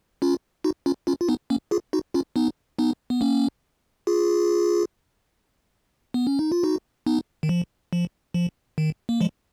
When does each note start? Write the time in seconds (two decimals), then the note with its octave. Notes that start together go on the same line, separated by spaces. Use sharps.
0.22 C#4 F4
0.64 D#4 F#4
0.86 C#4 F4
1.07 C#4 F4
1.21 F4
1.28 B3 D#4
1.50 A#3 C#4
1.71 F4 G#4
1.93 D#4 F#4
2.14 C#4 F4
2.36 B3 D#4
2.79 B3 D#4
3.10 B3
3.21 A#3 C#4
4.07 F4 G#4
6.14 B3
6.27 C#4
6.39 D#4
6.52 F4
6.63 D#4 F#4
7.06 B3 D#4
7.43 D#3
7.49 F3
7.93 F3
8.34 F3
8.78 D#3
9.09 A#3
9.21 F3 G#3